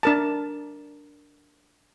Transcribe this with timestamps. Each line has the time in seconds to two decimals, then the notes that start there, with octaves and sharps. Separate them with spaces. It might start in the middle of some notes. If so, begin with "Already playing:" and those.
0.03 D4 A#4 A5